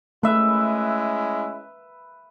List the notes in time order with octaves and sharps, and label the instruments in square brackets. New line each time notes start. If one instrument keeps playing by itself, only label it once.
[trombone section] G#3 C#4 E4 [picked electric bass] A3 [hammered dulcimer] B4 E5